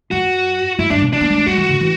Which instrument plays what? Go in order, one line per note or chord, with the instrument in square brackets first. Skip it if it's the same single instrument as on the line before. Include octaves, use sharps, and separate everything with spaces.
[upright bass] F#2 [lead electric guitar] F#4
[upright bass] F#2 [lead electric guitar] E4
[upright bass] G2 [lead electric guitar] D4
[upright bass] B2
[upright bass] G3 [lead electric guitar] D4
[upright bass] B3
G3
A3
[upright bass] G3 [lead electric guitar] F#4
[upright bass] E3
D3
E3